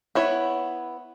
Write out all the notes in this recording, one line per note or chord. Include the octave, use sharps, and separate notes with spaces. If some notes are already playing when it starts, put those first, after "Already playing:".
B3 E4 C#5